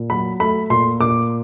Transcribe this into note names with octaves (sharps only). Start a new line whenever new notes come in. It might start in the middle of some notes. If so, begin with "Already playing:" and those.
Already playing: A#2
F#3 B5
A3 B5
A#2 C6
A#2 D6